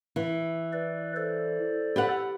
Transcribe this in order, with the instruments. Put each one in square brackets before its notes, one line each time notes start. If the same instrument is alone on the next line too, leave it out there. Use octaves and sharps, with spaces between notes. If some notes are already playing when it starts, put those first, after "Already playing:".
[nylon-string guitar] E3
[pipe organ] B4 D5
A4 C5 D5
[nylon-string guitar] G4 B4 F#5